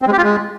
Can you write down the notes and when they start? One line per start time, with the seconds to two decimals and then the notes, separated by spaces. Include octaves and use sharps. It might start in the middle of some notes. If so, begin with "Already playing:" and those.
0.02 C4
0.07 G#3
0.13 G4
0.18 F4
0.23 G#3